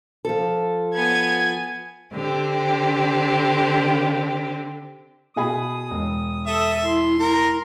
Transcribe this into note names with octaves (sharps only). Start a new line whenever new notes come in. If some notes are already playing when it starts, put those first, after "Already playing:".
F3 A4
B3 G#5 G#6
D3 C4 G4
B2 G#4 B5 D#6
E1
A4 E5 D#6
E4 C6
E4 A#4 A#5